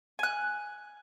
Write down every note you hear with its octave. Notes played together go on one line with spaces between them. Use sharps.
G#5 F#6